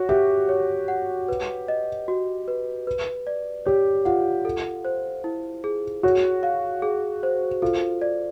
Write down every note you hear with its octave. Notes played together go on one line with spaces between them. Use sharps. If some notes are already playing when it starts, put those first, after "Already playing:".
Already playing: F#4 C#5
G4 E5
C#5
F#5
B4
D#5
F#4
B4
B4
D5
G4 C#5
F4 F#5
A4
C5
E4
G#4
F#4 C#5
F5
G#4
C5
F4 A4
D5